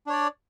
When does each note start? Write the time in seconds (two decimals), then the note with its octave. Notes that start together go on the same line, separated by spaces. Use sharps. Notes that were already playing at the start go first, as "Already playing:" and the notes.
0.07 D4
0.09 C#5
0.12 D5